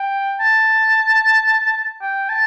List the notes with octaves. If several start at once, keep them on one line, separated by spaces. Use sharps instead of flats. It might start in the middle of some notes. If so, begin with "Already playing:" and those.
Already playing: G5
A5
G5
A5